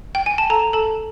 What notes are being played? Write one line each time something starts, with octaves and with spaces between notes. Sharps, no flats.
G5
G#5
A5
A4 A#5
A4 A5